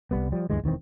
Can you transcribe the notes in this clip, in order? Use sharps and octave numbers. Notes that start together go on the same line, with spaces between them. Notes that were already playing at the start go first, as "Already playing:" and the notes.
C2 F#2 G3 B3
F3 G3
D2 G2 E3 G#3
E1 D#3 E3 C4